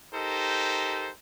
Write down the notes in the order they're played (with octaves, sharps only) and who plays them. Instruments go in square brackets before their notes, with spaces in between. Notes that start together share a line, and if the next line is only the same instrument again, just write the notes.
[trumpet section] D#4 G4 A4 A#4 C5